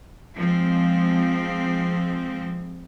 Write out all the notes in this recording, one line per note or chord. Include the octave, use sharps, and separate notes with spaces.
F3 G#3 C4